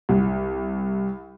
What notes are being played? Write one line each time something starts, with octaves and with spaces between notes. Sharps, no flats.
C2